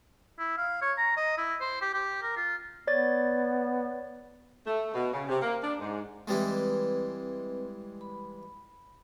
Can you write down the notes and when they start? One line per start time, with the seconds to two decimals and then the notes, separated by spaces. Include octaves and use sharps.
0.39 E4
0.58 F5
0.82 C#5
0.98 A#5
1.17 D#5
1.38 E4
1.61 C5
1.82 G4
1.94 G4
2.22 A#4
2.36 F4
2.87 B3 C#5 D5 A6
4.66 A3
4.94 B2
5.11 C#3
5.28 C3
5.42 A#3
5.63 D4
5.79 G#2
6.28 E3 G3 G#3 C4 B4
8.01 B5